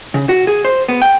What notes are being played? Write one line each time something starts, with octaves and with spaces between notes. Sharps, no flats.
C#3
F#4
G#4
C5
B3
G5